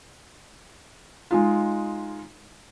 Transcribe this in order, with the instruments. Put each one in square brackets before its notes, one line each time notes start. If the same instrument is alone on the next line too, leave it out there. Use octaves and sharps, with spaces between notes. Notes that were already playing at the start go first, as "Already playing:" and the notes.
[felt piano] G#3 D#4 F4